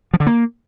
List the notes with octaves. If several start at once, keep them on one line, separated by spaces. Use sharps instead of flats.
F3
D3
A#3